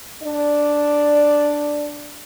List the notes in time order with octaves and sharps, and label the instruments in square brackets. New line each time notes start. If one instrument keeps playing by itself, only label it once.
[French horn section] D4 D5